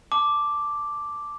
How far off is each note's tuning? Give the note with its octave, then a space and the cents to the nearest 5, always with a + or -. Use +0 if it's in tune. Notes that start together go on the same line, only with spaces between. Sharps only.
A5 +0 D6 +0